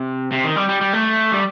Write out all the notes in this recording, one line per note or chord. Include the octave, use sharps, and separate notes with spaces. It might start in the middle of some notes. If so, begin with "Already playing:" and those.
Already playing: C3
C3
D#3
G3
G3
G3
A3
G3